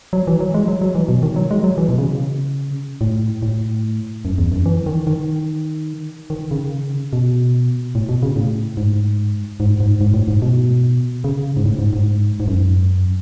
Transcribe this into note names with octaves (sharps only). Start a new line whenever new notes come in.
F#3
E3
F#3
G#3
F#3
F#3
E3
B2
D#3
F#3
G#3
F#3
E3
B2
C#3
A2
A2
F#2
E2
F#2
E3
D#3
D#3
D#3
C#3
B2
A2
B2
C#3
A2
G#2
G#2
G#2
G#2
A2
G#2
B2
C#3
G#2
A2
G#2
G#2
G#2
F#2